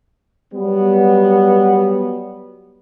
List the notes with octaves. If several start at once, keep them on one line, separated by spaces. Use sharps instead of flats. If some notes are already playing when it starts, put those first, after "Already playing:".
F#3 G3 B3